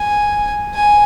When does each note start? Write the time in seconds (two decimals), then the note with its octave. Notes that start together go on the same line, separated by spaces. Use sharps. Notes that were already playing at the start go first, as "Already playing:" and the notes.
Already playing: G#5
0.75 G#5